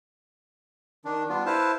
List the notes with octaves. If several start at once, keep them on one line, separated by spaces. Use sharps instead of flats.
D#3 D4
G3 B3 D4 F4
E4 B4 C5 F5 A5